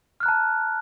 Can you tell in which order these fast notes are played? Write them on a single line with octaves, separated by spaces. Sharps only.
F6 F#6 A#5 A5